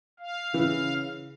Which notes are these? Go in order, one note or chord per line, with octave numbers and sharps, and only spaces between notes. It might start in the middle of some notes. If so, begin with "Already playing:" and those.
F5
C#3 E3